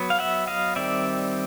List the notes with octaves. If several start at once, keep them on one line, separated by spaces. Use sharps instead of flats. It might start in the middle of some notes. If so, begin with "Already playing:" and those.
Already playing: F#3 B3
F5
E5 F#5
D#5 F5
D#3 G3 C4 D5 E5